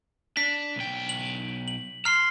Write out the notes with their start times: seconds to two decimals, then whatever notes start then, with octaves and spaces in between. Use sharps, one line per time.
0.37 D4 D5 B6
0.76 B1 G5
1.09 F#7
1.68 F#7
2.05 A#5 C6 F6 C7